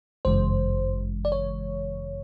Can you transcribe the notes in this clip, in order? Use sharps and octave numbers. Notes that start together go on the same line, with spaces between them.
G1 F#2 C#3 E3 G#3 C5
D5
C#5